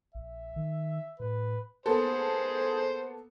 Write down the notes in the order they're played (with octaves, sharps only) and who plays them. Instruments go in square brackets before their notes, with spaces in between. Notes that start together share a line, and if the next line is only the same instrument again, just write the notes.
[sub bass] A#1 [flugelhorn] E5
[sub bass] D#3
[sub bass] A2 [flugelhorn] B4
[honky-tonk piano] A#3 B3 A4 [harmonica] G#4 C5